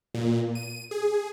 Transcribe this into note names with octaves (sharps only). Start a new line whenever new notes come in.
A#2
D#7
G#4